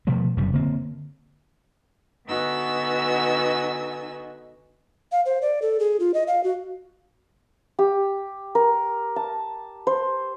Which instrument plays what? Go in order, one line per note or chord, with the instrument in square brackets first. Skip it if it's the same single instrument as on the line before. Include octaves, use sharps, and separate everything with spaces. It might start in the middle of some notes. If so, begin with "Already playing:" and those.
[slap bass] B2 F3 G3 A3
F#1 F#2 C3 G3
D3 A#3 C4
[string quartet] D3 B3 D#4 F#4 G#5 E6
[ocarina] F5
C5
D5
A4
G#4
F4
D#5
F5
F#4
[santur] G4
A#4
A5
C5